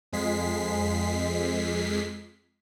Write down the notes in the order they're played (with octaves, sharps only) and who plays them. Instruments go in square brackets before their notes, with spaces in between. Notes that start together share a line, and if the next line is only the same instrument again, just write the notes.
[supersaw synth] F2 G#3 B6 C7